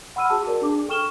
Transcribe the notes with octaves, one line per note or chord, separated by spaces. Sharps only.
F#5 B5 C6 E6 F6 D#7
F#4 G#4 A5
A#4 D5 A5
D4 G#4 D6
A4 G5 C#6 F6 E7 G7